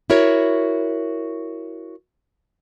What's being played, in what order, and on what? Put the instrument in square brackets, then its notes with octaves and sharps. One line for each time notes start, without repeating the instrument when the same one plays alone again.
[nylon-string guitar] E4 F#4 A#4 C#5